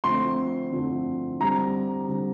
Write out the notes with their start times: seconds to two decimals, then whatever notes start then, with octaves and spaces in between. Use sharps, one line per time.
0.04 D3 F3 A3 C4 C6
0.72 D3 F3 A3 C4
1.40 D3 G3 C4 A#5
2.09 D3 G3 C4